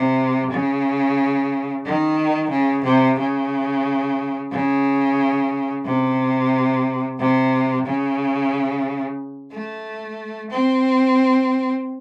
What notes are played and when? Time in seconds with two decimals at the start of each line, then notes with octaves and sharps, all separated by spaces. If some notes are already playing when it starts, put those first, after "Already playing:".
Already playing: C3
0.51 C#3
1.84 D#3
2.50 C#3
2.84 C3
3.18 C#3
4.50 C#3
5.84 C3
7.17 C3
7.85 C#3
9.51 A3
10.51 C4